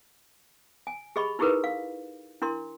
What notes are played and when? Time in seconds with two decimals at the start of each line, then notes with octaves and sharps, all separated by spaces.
0.87 G#5
1.16 G4 G#4 D#5 B5 C#6
1.39 D#4 E4 G4 G#4 A#4 B4
1.64 F5
2.42 D4 E4 A#4 C6